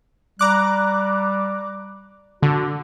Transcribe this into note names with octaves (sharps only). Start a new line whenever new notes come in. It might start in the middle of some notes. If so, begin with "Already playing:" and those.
G3 A#5 D6 F#6
D3 F#4